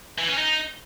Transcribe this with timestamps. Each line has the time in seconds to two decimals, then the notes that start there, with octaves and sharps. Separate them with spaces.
0.18 E3
0.28 C#4
0.38 D#4